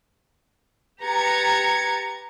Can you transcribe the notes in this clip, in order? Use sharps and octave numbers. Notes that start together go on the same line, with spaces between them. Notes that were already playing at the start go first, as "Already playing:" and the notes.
G4 B4 A#5 G#6 A6 C#7